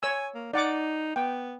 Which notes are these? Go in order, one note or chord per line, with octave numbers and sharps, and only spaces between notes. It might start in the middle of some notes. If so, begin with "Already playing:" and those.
C#5 G#5 E6
A#3
D#4 D5 F#5 D6
B3 G5